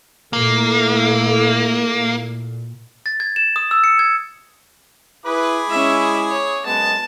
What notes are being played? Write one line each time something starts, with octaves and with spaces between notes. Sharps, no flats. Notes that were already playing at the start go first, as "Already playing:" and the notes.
A#2 A3 A#3 E4 A4
A6
G#6
E7
D#6
E6
C#7
G#6
E4 G#4 B4 B5 D6
G#3 C#4 E4 E5
C#5
F#2 G#3 B3 A5